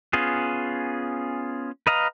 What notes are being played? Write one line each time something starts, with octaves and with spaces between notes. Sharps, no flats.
B3 C#4 F4 G#4
B4 D#5 F5 A#5